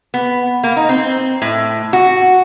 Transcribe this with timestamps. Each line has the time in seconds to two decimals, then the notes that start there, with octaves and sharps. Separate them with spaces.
0.14 B3
0.63 A#3
0.77 D#4
0.89 C4
1.42 A2
1.93 F#4